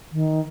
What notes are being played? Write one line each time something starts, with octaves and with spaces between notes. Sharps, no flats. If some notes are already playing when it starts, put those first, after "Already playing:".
D#3